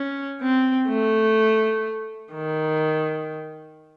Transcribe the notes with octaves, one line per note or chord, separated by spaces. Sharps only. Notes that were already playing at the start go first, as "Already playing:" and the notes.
Already playing: C#4
C4
A3
D#3